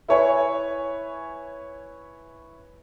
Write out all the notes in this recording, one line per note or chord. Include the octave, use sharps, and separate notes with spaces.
E4 B4 C#5 G#5 C#6